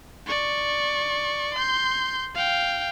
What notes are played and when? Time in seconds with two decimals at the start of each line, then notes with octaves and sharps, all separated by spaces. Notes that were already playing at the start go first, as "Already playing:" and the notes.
0.27 D5 C#6
1.54 C6 G6
2.35 F5 G5